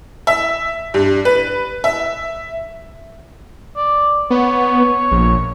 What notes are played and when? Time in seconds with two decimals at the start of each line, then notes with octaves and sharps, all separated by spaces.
0.27 E5
0.94 G2
1.25 B4
1.84 E5
3.77 D5
4.30 B3 C#5
5.11 A#1